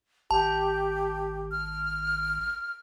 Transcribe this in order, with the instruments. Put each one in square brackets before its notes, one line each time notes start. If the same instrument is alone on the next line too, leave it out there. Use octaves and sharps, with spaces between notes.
[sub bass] G#1 [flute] G4 [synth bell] A5
[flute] F6